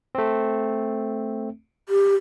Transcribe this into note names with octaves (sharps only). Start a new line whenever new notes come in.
A3 C4
G4